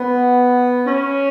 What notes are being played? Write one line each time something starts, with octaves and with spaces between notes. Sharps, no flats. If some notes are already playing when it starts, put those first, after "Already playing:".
Already playing: B3
C#4